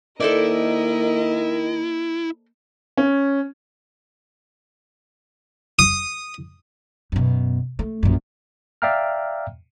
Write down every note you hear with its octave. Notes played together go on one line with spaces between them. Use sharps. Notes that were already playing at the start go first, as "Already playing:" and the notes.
D#3 A#3 E4 A4 A#4 C5 D5 D#5
C#4
D#6
F#2 B2
A3
A#1 F#2
D5 E5 F5 G5 A#5 F6